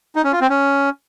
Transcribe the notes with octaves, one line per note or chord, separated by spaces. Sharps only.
D#4
C#4
F4
C4
C#4